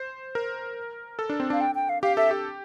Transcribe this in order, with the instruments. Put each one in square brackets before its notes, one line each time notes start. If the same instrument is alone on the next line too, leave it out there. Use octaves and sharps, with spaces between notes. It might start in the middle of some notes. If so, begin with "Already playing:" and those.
Already playing: [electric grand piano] C5
A#4
A4
D4
C4
D4
[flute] F5
G5
G5
F5
[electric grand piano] G4 [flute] F5
[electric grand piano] A4 [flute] E5
[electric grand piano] G4